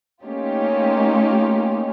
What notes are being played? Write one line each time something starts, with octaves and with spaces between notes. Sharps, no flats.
A3 A#3 C#4 D#4 F4 G4